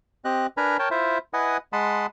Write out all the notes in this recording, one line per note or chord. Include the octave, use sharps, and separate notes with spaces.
C4 G4 D#5 F#6
D4 A#4 B4 G#5 A#5 B5
A#4 C#5 G5 A5
E4 F4 C5 E5
E4 B4 D#5 F#5 G#5 D#6
G#3 F#5 A5 B5 C6 D#6